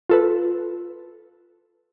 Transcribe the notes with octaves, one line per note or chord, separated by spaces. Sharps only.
F4 A4 B4